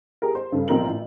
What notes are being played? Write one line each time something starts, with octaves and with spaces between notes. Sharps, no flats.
G4 G#4 A#4
C5
G2 C#3 A4
A#1 C4 D#4 A#4 F#7
A1